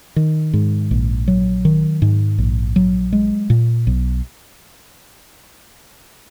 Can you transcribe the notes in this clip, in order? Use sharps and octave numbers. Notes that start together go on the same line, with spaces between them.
D#3
G#2
A#1
F#3
D#3
G#2
A#1
F#3
G#3
A#2
B1